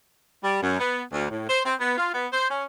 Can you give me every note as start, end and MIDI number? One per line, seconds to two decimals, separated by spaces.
0.43 0.59 55
0.62 0.77 42
0.80 1.02 59
1.13 1.29 38
1.30 1.45 45
1.49 1.60 72
1.64 1.74 60
1.79 1.94 59
1.97 2.09 65
2.13 2.26 59
2.32 2.47 72
2.49 2.64 61